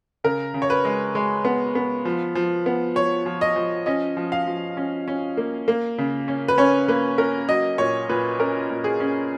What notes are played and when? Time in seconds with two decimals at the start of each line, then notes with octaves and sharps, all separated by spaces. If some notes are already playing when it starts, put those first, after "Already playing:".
0.24 C#3 A#4
0.54 C#3
0.62 C#5
0.70 B4
0.85 G#3
1.15 G#3
1.45 B3
1.75 B3
2.05 F3
2.35 F3
2.66 B3
2.95 F3 C#5
3.26 F3
3.41 D#5
3.56 F3
3.86 C#4 D#5
4.17 F3
4.32 F5
4.47 F3
4.77 C#4
5.08 C#4
5.37 A#3
5.68 A#3
5.98 C#3
6.28 C#4
6.48 B4
6.58 C#4 C#5
6.88 A#3 B4
7.18 C#4 A#4
7.49 F#3 D#5
7.78 A#2 C#5
8.09 A#2 B4
8.39 C#4 A#4
8.70 A#2
8.84 G#4
9.00 C#4